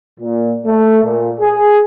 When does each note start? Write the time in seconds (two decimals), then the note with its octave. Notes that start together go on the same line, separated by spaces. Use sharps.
0.19 A#2
0.66 A3
1.04 A#2
1.40 G#4